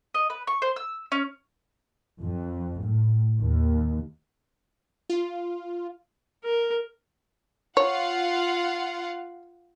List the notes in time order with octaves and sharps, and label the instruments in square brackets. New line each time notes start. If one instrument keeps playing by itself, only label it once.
[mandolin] D#5
B4
C#6
C5
E6
C#4
[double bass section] F2
A2
D#2
[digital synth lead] F4
[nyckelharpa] A#4
[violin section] F4 F5 F#5 [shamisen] C#5